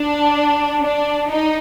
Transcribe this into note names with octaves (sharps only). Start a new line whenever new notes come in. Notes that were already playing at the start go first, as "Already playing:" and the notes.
Already playing: D4
D4
D#4